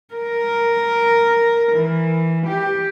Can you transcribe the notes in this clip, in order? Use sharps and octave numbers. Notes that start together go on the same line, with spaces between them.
A#4
E3
G4